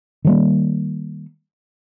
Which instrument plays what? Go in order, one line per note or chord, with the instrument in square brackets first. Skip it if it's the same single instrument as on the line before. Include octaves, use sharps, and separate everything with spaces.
[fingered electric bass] D#3 G3 A#3